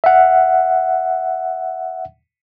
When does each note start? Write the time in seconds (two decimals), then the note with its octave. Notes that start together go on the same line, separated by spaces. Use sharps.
0.04 E5 F#5